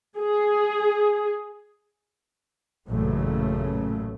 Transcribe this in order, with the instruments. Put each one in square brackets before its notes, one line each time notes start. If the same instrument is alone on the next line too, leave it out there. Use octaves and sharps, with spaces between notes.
[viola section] G#4
[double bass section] A1 F#2 A#2 C#3 A3